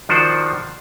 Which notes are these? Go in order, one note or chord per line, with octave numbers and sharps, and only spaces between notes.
D#3 F3 D4 F#4 C5